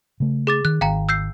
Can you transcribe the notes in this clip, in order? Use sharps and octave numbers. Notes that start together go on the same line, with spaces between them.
C#3 A3
G#4 D6 A6
D#3 F#6
G#1 D#3 F5 G5 A#5
E6 G6 C7